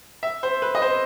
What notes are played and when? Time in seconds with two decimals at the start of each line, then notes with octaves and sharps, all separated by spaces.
0.23 E5
0.43 C5
0.62 B4
0.75 D#5
0.82 C5